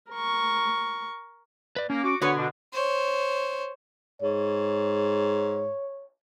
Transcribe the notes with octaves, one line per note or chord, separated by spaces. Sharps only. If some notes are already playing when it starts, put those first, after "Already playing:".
A#4 C#6
B4 D5
A#3 C#4
F#4 D6
D3 B3 F#4 B4 C#5 G#5
B2 D4
C5 C#5
G#2 C#5